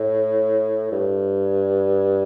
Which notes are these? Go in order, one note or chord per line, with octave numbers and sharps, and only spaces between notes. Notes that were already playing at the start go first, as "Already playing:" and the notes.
Already playing: A2
G2